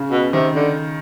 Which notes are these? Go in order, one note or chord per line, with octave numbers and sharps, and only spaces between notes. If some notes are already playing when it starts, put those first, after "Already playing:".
Already playing: C#3
B2
C3 D#3
D3